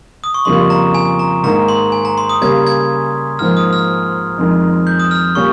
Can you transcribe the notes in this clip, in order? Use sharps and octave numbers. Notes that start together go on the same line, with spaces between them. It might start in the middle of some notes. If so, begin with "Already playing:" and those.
D#6
C#6
F2 C#3 G3 A#3 F4 C6
A#5
G#5
A#5
G#2 D#3 A#3 D#4 A#5
C6
G#5
A#5
C6
D#6
C#3 G3 A#3 C#4 G#6
G#6
G#2 F3 A#3 F6
D#6
F6
F2 D#3 G#3 D#4
G6
D#6
F6
A#2 G3 A#3 C#4 C#6